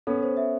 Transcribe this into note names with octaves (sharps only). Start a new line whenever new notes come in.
B3 C#4 A4
C5
E5